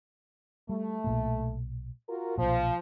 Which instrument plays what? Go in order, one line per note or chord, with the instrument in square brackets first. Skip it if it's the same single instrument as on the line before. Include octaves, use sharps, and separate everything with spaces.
[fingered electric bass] G3 [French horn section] A3
[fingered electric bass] B1 A#2 A#3
[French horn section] F4 F#4 A#4
[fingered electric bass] B1 A#2 [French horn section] F3